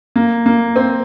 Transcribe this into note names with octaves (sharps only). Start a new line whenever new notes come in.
A#3
A#3
C4